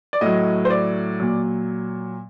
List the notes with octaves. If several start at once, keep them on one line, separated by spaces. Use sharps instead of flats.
D5
A2 F#3 D#5
C5
D5
A#2 F#3